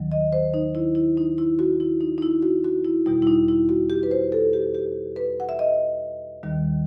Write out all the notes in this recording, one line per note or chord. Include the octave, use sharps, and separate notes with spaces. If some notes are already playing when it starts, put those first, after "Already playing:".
Already playing: D#2 D#3 F#3
D#5
C5
D#4
E4
E4
D#4
E4
F#4
E4
D#4
D#4
E4
F#4
F#4
E4
E2 B2 G3 E4
E4
D#4
E4
F#4
G4
B4
C5
A4
G4
G4
B4
F#5
E5
D#5
D#2 D#3 G3